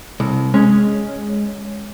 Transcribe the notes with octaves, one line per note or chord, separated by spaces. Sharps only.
C2
G#3 C#4